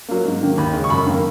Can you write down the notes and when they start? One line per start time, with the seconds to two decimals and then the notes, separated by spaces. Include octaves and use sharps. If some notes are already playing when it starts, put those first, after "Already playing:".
0.08 F#3 A#3
0.25 G#2
0.41 D#3 A#3
0.58 D#2 B5
0.73 C#3 G#3
0.84 C#6
0.89 F#2 B5
1.06 D#3 A#3